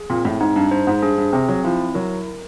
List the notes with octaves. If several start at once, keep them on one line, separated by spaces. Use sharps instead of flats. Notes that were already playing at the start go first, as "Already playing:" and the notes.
Already playing: G#4
A#2 C4
A2
G#2 D#4
G2
G2 C5
G#2
G2 G#4
G2
C3 C4
F#3
F3 E4
F#3 A#4